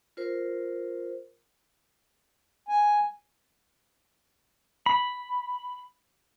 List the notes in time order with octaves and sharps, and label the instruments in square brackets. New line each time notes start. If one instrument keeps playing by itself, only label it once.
[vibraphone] F4 A#4 C5
[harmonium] G#5
[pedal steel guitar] B5